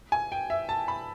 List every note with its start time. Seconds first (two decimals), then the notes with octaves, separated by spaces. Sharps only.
0.12 G#5
0.32 G5
0.50 E5
0.69 A5
0.88 B5